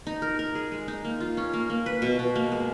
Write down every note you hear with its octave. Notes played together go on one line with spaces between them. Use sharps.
D#4
A#4
A#4
G#4
G#3
D#4
A#3
F4
C#4
A#3
A#3
B4
B2
B2
A#3
G#3